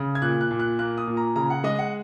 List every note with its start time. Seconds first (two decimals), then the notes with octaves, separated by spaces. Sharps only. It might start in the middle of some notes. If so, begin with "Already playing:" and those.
Already playing: C#3
0.15 G#6
0.22 A#2 F#6
0.41 F#6
0.51 A#2
0.59 F#6
0.79 A#3 F#6
0.98 D#6
1.07 A#2
1.17 A#5
1.36 C#3 A#5
1.50 F#5
1.64 G#3 D#5
1.79 F#5